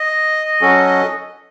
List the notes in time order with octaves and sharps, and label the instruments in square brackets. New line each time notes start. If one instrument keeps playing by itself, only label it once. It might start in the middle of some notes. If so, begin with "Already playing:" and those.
Already playing: [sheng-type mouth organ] D#5
[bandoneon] F#3 C#4 F#4 A4